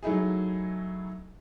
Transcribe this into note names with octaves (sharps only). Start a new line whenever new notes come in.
F#3 A3 D#4 E4 G#4